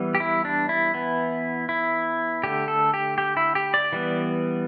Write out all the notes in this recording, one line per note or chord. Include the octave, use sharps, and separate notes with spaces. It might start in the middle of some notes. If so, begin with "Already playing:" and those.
Already playing: E3 G3 B3
G4
E4
D4
E4
E3 B3
E4
D3 A3 G4
A4
G4
G4
E4
G4
D5
E3 G3 B3